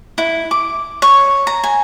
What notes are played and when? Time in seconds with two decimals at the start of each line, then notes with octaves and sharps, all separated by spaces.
0.18 E4
0.51 D6
1.02 C#5
1.47 A#5
1.64 G#5